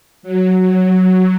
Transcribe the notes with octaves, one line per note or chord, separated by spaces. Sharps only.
F#3